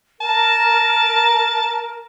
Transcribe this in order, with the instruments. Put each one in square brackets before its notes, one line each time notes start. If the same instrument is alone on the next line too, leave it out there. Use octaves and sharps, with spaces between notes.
[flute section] A#4 [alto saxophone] A5